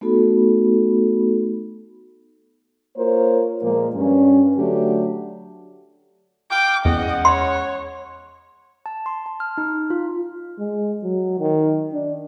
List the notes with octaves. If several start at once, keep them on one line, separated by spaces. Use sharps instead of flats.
A3 B3 D#4 F#4 A4 B5
A#3 F4 A#4 C5 C#5
A#2 F3 G#3 A#3
G2 C#4
D3 F#3 A3 D4 G4
F5 G5 D6
E2 G#3 C#4 D#5 F#5
C#5 C6
A5
C6
A5
F6
D#4
F4
G#3
F#3
D#3
D4